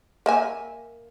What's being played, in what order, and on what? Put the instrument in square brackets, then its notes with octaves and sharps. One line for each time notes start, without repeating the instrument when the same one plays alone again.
[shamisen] A#3 E5 G#5